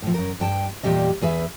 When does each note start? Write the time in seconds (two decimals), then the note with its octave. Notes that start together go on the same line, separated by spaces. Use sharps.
0.02 A2 F3
0.14 F#2 A#4
0.40 G2 G5 A5
0.83 E2 A#2 G3 G4 D#5
1.21 E2 G#4 B4 E5